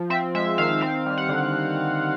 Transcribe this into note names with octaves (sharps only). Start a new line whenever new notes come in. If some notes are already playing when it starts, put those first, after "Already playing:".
Already playing: F3
C4 E5
G#3 E5
D#3 F5
C4 F5
G3
F#5
D3